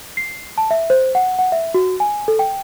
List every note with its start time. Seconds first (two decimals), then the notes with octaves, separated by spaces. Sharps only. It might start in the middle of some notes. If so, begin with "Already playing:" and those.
0.17 C7
0.58 A5
0.71 E5
0.90 C5
1.15 F#5
1.39 F#5
1.52 E5
1.74 F#4
2.00 G#5
2.28 A4
2.39 G5